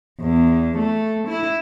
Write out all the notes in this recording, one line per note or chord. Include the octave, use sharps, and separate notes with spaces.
E2
A3
E4